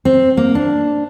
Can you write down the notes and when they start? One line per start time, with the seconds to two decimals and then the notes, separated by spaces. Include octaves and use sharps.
0.05 C4
0.37 A#3
0.55 D4